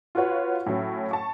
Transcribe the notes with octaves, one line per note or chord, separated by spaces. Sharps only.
F4 F#4 B4 C#5 F#5
A2 F#3 C#4
A5 C#6